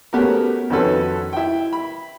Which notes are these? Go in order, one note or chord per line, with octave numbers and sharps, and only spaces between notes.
A3 B3 C#4 F#4 G4 A#4
F2 D#3 C#4 F#4 A4 B4
E4 G5
B5